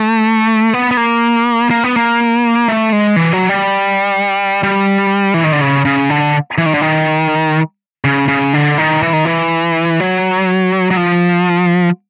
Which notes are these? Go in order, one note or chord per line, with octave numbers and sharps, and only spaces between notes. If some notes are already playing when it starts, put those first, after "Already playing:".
Already playing: A3
B3
B3
A#3
A#3
B3
A#3
A3
G#3
E3
F#3
G3
G3
E3
D#3
D3
C#3
C#3
D3
E3
D#3
D3
D#3
C#3
C#3
D3
D#3
E3
D#3
E3
F#3
F#3
F3